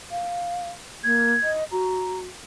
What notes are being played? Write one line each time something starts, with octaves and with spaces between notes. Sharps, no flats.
F5
A#3 G#6
D#5
F#4 A#5